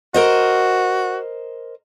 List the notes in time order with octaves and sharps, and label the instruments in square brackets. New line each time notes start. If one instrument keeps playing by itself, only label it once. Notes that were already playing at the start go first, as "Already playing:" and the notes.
[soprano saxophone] F#4 [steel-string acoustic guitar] A#4 C5 D#5